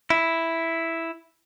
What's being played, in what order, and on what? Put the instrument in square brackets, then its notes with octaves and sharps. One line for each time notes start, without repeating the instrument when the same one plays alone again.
[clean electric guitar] E4